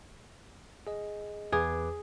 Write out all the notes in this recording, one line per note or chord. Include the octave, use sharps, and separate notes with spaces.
G#4 D#5
E2 G#4 B4 D6